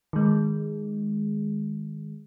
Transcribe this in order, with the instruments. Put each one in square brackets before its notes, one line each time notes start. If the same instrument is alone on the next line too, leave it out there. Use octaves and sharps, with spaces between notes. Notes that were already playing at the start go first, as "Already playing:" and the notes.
[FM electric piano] D#3 G#3